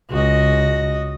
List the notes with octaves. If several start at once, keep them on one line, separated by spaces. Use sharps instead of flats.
C#2 F#4 D#5